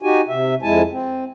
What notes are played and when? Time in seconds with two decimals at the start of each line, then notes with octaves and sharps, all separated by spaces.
0.02 D#4 F#4 G4 G#5
0.29 C3 E5
0.62 F2 G#3 E4 G#5 A5
0.90 C4